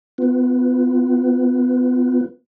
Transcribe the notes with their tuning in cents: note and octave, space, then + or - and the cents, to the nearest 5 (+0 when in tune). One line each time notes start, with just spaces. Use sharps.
B3 +30 F4 +0 B4 +0